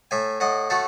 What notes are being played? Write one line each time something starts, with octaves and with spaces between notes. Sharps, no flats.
A2 E5 G#5
A2 D#5 F#5
A3 F#4 A4